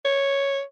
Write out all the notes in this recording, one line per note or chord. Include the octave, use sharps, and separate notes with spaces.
C#5